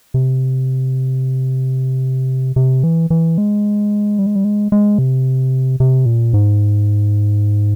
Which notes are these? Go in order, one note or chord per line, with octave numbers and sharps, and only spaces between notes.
C3
C3
E3
E3
G#3
G3
G#3
G3
G#3
G#3
C3
C3
A#2
G#2